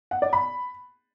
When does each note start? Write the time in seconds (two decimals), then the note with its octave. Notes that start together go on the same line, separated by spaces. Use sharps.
0.11 F#5
0.22 D5
0.33 B5